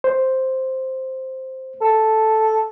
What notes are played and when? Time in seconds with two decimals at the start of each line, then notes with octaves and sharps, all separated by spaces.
0.04 C5
1.81 A4